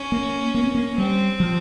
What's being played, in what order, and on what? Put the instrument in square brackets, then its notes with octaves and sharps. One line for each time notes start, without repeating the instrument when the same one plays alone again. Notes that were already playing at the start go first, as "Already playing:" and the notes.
Already playing: [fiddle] C#4
[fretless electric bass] A#3
A#3
C4
A#3
[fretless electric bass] G3 [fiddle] C4
[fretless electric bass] F3